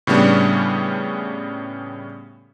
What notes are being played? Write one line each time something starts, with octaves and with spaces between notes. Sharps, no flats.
A2 C#3 G3 B3 C#4 D4